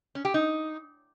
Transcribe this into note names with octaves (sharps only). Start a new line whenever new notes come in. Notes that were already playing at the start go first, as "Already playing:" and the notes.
C#4
G4
D#4